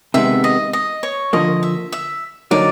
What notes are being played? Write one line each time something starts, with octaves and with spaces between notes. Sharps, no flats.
C3 D#3 G#3 B3 E5
D#5
D#5
C#5
D3 F3 A#3 D#5
E5
E5
D3 F#3 A#3 D#4 D5